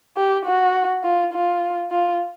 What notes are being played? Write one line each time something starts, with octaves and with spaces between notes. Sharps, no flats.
G4
F#4
F4
F4
F4